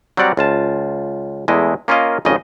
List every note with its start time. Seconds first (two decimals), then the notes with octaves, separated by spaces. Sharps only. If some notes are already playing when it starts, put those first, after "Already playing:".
0.17 F#3 G3 C4 D5 F#5 A#5
0.37 C#2 F4 A5
1.48 E2 G#3 A3 E4 D#5
1.88 A#3 C#4 F4 A#4 D#5 F5
2.25 G#1 F2 C#3 C#4 D#5